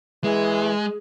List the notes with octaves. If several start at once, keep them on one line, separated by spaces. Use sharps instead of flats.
E3 G#3 G#4